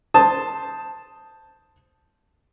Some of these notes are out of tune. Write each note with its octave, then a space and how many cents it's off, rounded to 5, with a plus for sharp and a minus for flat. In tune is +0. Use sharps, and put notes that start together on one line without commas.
C5 +0 A5 +0 D#6 +0